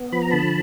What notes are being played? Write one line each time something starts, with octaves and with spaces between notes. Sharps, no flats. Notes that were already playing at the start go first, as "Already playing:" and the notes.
Already playing: B3
F3 B5
A#5
D3 A5 B5